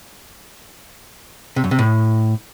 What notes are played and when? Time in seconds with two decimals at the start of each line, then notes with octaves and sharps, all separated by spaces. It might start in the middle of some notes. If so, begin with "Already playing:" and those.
1.56 C3
1.64 F#2
1.71 C3
1.79 A2